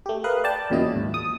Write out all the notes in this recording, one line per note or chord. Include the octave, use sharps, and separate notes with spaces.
A3 G4
A#4 B4 F5 D#6 F#6
D5 G5 A5
E2 A#2 C#3 F#3 E4 D#5
D#2 G#2
D#6